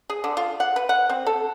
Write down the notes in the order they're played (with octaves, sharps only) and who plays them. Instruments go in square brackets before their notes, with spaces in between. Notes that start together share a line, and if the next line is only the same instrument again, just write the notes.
[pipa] G#4
D3
F4
F#5
B4
F#5
C4
A4